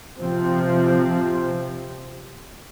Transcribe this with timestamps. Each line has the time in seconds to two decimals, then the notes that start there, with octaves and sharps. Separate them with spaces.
0.17 C3 F3 C4